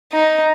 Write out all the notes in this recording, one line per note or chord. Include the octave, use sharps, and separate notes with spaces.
D#4